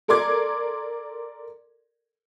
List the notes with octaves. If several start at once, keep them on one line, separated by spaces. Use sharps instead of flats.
A4 A#4 D5 C6 D6 G#6